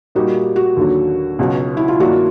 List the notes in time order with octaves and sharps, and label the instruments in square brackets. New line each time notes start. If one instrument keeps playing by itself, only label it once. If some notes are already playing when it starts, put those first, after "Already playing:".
[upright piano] A#2 G3 A#3 D#4 G4 [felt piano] F#4
[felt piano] F#4
[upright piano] D#2 D3 F#3
C#2 B2 F#3
[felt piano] E4
F4
[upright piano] G2 D#3 F#3 A#3 D4 [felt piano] F#4